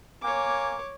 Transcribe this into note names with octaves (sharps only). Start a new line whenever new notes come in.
A#3 C#5 G#5 D6